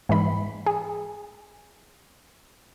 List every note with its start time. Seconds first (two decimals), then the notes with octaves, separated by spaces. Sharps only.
0.09 G#2 E3 B5
0.66 G#4